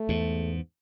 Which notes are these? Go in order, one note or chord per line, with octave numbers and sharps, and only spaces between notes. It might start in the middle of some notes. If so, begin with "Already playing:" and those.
Already playing: A3
E2 G#2